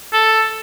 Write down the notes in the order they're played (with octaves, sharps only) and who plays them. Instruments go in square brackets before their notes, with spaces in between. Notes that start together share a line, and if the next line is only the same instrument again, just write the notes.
[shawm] A4